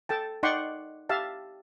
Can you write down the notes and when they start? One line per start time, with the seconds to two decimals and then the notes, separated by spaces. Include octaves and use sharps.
0.09 A4 G5 A5
0.43 D#4 D5 F#5 G5 C6 C#6
1.09 G4 E5 F5 A5